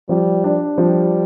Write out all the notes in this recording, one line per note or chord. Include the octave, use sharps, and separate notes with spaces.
F3 G3
D4
F3 G3